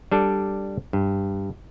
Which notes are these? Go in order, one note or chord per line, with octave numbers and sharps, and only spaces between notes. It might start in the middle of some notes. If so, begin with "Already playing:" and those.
G3 D4 A4
G2